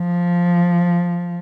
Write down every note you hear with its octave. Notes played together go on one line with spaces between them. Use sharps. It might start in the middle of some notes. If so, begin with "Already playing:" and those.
Already playing: F3